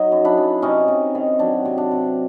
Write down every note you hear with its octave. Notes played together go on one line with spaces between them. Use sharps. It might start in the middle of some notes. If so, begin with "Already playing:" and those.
Already playing: F#3 D#4
F#2
D4 E4
F#2
C3 C#4 D#4
C3
D#3
F#3 D4
C3
D4
C3